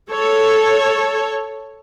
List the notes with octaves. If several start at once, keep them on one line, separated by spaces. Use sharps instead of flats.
A4 C#5